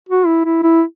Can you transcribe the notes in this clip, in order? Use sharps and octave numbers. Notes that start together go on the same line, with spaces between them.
F#4
E4
E4
E4